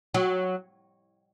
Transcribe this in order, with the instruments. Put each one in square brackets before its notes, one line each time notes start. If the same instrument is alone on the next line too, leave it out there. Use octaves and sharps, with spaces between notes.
[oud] F#3